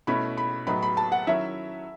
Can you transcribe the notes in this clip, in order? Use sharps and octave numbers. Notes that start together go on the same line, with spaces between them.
B2 A3 C#4 E4 B5
B5
A2 F#3 B3 D#4 B5
B5
A5
F#5
D#3 F#3 C#4 E4 E5